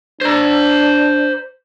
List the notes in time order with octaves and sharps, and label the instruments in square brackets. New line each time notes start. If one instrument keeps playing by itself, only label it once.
[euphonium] D4 [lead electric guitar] C5 A#5